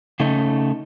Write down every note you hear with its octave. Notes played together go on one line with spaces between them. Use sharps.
C#3 A3 C#4 D#4